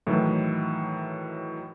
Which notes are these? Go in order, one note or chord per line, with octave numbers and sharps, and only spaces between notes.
A2 D#3 E3 F#3